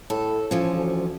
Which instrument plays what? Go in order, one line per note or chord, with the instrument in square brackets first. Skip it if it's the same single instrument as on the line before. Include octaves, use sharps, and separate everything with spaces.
[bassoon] A2 [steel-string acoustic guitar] A4
[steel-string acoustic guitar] E3 F3 C#4 [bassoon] F4
[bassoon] D2